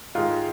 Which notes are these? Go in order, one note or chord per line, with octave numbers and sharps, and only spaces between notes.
G#2 D#3 G#3 F4